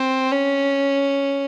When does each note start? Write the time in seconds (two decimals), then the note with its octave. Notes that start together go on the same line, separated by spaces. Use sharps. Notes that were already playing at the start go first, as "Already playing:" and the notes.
Already playing: C4
0.31 C#4